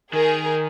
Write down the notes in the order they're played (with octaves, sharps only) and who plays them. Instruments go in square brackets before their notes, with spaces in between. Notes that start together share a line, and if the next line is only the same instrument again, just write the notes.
[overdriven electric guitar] D#3 [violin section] G#4 A#4